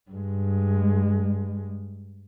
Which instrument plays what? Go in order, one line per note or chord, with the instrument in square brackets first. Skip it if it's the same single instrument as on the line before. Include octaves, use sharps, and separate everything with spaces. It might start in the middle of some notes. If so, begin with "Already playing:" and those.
[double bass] G2 G#3